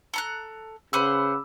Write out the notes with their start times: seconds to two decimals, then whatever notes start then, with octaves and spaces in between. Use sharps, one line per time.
0.14 A4 A#5 F#6
0.93 C#3 B4 C5 F#5 B5 D6 E6